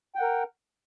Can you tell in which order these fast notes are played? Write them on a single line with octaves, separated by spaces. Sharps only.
G5 F#5 A#4